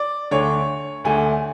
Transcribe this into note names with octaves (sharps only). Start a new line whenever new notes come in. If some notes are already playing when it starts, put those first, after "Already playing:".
Already playing: D5
D2 D3 A3 D4 C#5
D2 D3 A3 D4 G#5